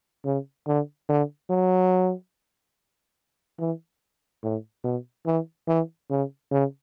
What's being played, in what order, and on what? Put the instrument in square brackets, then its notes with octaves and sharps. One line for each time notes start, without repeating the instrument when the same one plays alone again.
[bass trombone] C#3
D3
D3
F#3
E3
A2
B2
E3
E3
C#3
C#3